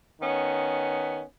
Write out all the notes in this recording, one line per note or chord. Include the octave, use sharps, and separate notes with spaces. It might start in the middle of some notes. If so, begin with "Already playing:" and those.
D#3 B3 C#4